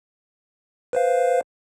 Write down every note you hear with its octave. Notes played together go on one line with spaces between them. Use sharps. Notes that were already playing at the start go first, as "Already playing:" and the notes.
B4 C5 F5